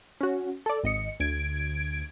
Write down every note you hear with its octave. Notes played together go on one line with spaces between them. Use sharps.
C#4 F#4
A4 D5
G#1 D#5 C#7
D2 G#6 D7